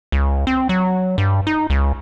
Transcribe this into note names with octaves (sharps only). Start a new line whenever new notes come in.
C#2
C4
F#3
G2
D#4
C#2